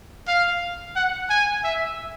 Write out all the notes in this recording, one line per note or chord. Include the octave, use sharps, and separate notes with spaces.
F5
F#5
G#5
E5